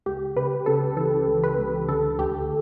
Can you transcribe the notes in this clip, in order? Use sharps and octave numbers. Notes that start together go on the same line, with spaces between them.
C#2 G4
C#2 B4
C#3 A4
E3 A4
C#2
B4
C#2
D3 A4
D2 G4